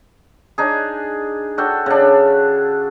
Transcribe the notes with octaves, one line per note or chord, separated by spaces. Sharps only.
D4 D#4 G#4
D4 F#4 A4 G5
C#3 D4